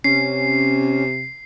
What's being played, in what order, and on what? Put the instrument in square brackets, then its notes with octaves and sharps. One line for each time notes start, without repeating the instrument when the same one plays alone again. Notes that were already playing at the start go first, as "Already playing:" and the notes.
[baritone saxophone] C3 [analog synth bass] C#4 [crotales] C7